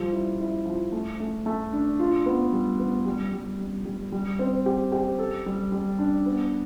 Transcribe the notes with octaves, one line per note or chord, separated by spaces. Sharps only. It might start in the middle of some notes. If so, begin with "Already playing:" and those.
Already playing: F3 G3
E4
E4
F3
A3
A3
A3
D4
F4
B3
G3
B3
G3
G3
G3
G3
G3
C4
G4
G4
A4
G3
G3
D4
B3